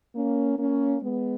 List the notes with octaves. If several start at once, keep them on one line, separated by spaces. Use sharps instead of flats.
A#3 C#4
A#3 C#4
G#3 B3